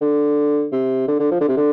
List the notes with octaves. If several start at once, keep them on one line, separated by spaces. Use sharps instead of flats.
D3
C3
D3
D3
F3
D3
C3
D3